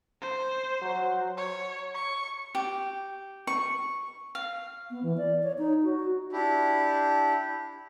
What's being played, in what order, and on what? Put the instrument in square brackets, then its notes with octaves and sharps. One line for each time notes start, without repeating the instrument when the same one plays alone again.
[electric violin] C5
[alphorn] F#3
[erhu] C#5
C#6
[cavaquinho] G4
C#6
F5
[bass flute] B3
E3
D5
C#5
D#4
F#4
[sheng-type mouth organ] D4 E4 G4